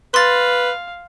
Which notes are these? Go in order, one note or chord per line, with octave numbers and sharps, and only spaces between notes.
B4 F5 C6 A6